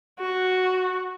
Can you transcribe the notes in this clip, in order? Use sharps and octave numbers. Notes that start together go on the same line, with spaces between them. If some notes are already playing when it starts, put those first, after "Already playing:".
F#4